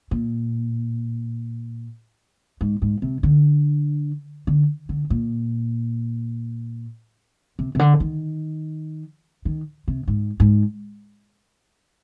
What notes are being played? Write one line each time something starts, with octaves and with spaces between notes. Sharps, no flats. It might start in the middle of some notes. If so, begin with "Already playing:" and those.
A#2
G#2
G#2
C3
D3
D3
D3
A#2
C3
C3
D3
D#3
D#3
C3
G#2
G#2